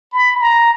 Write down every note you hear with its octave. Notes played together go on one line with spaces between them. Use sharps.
B5
A#5